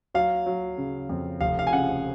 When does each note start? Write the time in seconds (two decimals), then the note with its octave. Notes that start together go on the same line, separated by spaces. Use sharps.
0.15 F#3 F5
0.46 F#3
0.78 C#3
1.09 F2
1.41 F1 F5
1.59 F5
1.67 G#5
1.73 C#3 F#5